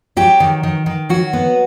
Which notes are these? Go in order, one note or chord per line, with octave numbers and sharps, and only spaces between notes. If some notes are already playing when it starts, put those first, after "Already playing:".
F#3 G4
D#3
D#3
D#3
F#3 F#4
B3